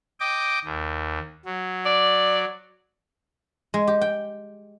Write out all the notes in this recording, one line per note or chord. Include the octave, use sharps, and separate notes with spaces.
D#5 G5 D6
D#2
F#3
D5
G#3
G4
G5